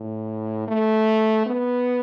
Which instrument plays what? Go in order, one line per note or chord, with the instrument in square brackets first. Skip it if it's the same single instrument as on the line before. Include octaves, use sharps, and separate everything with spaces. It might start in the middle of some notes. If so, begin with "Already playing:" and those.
Already playing: [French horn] A2
A3
B3